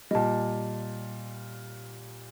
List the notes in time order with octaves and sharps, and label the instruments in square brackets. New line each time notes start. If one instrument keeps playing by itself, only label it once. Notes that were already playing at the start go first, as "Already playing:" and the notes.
[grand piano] A#2 G3 [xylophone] D#5 A5